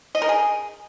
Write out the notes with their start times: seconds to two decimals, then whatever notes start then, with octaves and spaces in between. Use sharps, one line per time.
0.15 D#5
0.22 A#4
0.29 G#4